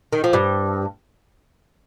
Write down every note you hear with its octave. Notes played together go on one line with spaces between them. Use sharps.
D#3
F3
G2 G3